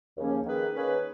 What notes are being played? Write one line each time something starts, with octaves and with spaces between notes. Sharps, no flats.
D#2 C#3 F3 A#3 C#4
D#3 A#3 C#4 G#4 B4
D#3 A#3 C#4 G#4 B4